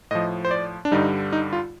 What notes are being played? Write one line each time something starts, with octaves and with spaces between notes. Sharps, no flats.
A2 F3 D#5
C5
D5
D4
G2 D3 G3 D#4
D#4
F4